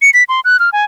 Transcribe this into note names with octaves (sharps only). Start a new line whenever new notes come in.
C#7
B6
C6
F#6
F6
G#5